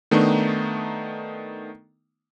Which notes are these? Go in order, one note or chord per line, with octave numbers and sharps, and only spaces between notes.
D#3 A3 B3 D4 D#4